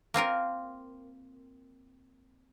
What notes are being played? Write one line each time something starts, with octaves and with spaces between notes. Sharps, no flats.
A#3 C4 F4 A#4